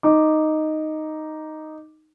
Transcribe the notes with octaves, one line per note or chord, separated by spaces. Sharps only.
D#4 D6